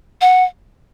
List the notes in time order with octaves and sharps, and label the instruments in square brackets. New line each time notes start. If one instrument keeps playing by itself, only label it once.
[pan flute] F#5